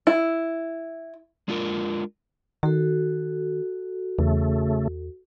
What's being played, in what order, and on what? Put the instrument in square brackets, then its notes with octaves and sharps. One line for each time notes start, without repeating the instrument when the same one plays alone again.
[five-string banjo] E4
[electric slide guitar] G#3 D4 F4 F#4 A#4
[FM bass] D#3 [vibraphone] F#4 A4
[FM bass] E2 [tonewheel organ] C#3 A3